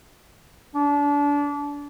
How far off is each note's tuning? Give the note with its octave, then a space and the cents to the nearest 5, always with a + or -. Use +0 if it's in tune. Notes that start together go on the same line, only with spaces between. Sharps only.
D4 -30